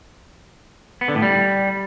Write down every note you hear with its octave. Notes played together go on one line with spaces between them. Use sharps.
B3
D3
A2
G3